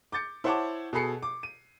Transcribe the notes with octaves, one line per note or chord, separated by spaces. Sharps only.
D6 G6 A6 C#7
E4 C5 C#5 F#5 A5 D6
B2 G#4 A4 B5 C7 C#7
D6
D#7